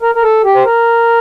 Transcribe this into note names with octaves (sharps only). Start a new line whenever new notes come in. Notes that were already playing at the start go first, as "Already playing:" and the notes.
A#4
A#4
A4
G4
C5
A#4